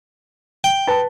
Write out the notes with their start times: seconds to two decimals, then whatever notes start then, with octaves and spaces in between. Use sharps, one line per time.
0.64 G5
0.87 B4 A5